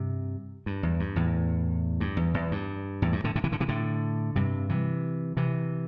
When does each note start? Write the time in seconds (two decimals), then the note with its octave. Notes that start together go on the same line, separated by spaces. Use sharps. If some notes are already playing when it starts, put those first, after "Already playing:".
Already playing: G2 C3
0.66 G2
0.83 E2
1.00 G2
1.16 E2 A2
2.00 G2
2.17 E2
2.34 E2
2.51 G2
3.02 E2 A2
3.12 G2
3.24 A2 D3
3.36 A2 D3
3.44 C3 E3
3.52 A2 D3
3.60 C3 E3
3.68 A2 D3
4.36 G2 C3
4.69 C3 E3
5.37 C3 E3